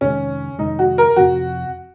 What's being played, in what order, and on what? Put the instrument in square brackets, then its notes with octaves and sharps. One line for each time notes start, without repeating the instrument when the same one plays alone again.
[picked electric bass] F2 C3 D#3 G#3 [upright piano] C#4
[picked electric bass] F2 C3 D#3 G#3 [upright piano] D#4
[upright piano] F#4
A#4
[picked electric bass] F2 C3 F3 [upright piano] F#4